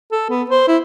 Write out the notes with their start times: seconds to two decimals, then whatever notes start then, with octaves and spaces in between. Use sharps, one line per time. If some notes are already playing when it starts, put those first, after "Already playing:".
0.12 A4
0.30 B3
0.50 C5
0.68 E4